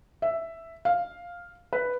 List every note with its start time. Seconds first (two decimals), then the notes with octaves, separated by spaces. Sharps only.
0.22 E5
0.85 F5
1.73 B4